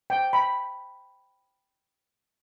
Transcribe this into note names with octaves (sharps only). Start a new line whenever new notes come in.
G5
B5